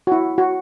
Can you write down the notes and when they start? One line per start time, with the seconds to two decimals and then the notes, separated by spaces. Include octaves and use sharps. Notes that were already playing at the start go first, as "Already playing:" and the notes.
0.07 F#4
0.12 E4
0.38 F#4